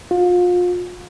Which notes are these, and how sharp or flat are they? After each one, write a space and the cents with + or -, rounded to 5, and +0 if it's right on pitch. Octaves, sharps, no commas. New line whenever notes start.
F4 +30